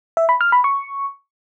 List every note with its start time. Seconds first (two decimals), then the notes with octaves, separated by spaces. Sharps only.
0.17 E5
0.29 B5
0.41 F6
0.52 B5
0.64 C#6